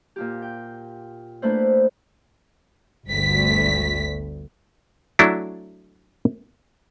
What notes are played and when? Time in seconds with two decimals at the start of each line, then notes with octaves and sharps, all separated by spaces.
0.16 A#2 F4 G4
0.42 G5
1.42 A3 A#3 D4 E4 B4 C5
3.07 G1 D2 B6
5.19 F#3 A3 D4 E4